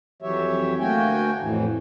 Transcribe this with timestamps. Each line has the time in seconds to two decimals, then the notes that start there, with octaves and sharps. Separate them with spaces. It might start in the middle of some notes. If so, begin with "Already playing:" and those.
0.22 F2 E3 F#3 G4 C#5 E5
0.80 D2 A3 A#3 F#4 G5 G#5
1.40 F2 A2 E3